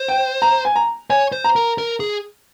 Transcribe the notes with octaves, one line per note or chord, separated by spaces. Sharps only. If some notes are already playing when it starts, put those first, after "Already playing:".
Already playing: C5
G5
A#5
G#5
A#5
C#5 G#5
C5
A#5
A#4
A#4
G#4